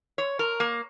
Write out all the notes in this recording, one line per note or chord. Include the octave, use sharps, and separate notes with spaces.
C#5
A#4
A#3